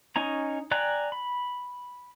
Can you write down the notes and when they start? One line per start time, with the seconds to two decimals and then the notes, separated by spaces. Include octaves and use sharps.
0.16 C#4 D#4 G#5 A#5
0.71 D5 G5 G#5 A#5 F#6
1.12 B5